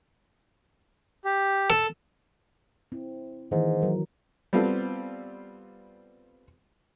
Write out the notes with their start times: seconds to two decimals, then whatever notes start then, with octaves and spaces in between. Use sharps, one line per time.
1.25 G4
1.70 A4
2.92 C4 E4
3.51 G#2 D#3 E3 A#3
3.82 F#3 A#4
4.53 G3 B3 C4 F4 A4